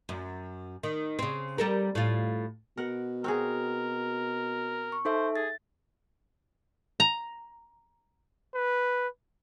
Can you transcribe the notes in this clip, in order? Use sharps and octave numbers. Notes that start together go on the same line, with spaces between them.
F#2
D#3
C#3 C4
G3 A4 A#4
A2 F4
B2 A#4 F#5
C4 F#4 G#4 A#4
C#6
D#4 A4 C5 E5
G#4 A6
A#5
B4